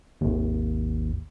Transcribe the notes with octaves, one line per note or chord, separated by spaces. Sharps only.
G#1 D#2